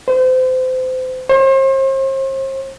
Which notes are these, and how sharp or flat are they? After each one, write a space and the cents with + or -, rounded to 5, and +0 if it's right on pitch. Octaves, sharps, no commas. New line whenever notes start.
C5 -30
C5 +40